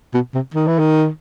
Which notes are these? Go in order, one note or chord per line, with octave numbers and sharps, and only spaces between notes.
B2
C3
D#3
E3
D#3